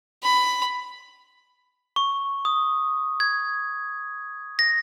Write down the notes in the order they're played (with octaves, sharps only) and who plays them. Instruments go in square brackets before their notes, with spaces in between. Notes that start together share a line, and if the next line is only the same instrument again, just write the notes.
[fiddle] B5
[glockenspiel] C#6
D#6
G#6
A#6